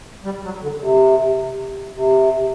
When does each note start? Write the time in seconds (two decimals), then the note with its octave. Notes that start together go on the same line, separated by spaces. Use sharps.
0.24 G3
0.44 F#3
0.62 D3
0.81 C3
1.95 C3